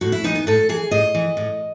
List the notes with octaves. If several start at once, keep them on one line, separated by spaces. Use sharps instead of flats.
A2 F#4
E4
E3 D#4
B3
A2 A4
E3 G#4
A2 D#5
E3
A2